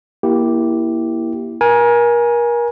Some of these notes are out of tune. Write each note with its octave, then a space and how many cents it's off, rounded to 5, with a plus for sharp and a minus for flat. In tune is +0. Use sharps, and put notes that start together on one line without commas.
A#3 +20 E4 +0 G4 -5
A#4 +30 G#5 +0